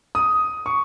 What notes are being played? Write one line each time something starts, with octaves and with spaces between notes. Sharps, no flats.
D#6
C#6